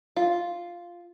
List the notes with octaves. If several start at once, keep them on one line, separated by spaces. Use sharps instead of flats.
F4